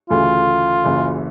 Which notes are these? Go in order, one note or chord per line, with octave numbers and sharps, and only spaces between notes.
D2 C#3 E3 A3 F4
F#1 F#2 C#3 E3